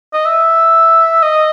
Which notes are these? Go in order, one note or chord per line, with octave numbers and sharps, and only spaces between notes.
D#5
E5
D#5